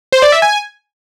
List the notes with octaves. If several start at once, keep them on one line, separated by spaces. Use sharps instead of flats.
C5
D5
E5
G#5